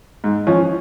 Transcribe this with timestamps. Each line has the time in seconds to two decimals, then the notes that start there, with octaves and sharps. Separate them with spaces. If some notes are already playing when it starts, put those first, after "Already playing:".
0.24 G#2
0.47 F3 C#4